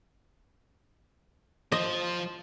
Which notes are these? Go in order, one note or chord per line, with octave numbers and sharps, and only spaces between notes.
F3 C5 D#5